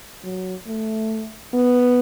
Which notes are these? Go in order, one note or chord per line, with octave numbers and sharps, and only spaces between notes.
F#3
A3
B3